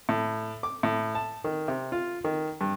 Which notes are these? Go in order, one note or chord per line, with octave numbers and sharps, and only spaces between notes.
A2
D6
A2
A5
D#3
C3
F4
D#3
G2